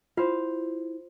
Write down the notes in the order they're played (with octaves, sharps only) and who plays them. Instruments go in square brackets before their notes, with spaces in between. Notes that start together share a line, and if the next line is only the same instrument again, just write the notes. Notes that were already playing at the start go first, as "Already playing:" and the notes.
[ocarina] E4 [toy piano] F4 [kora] C5 F5